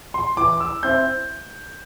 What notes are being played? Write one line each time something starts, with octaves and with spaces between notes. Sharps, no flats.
C6
E3 D6
E6
C4 E4 G6